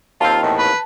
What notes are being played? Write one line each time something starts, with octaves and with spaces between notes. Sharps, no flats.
D#2 C4 F4 A5
E2 A2 D#3
B4